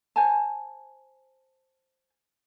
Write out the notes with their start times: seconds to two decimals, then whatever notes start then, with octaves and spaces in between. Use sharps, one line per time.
0.16 C5 G#5 A5